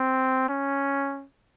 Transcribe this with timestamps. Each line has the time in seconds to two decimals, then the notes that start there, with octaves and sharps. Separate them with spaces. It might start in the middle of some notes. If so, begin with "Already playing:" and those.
Already playing: C4
0.49 C#4